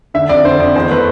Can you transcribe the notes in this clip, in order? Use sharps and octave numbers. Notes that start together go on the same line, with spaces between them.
D3 E5
F2 D5
D3 C5
F2 D5
E2 C5
A3 B4